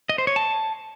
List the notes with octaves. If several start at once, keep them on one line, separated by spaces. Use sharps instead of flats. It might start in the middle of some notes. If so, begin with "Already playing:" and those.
D#5
C5
C#5
A5